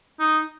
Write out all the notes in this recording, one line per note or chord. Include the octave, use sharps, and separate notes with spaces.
D#4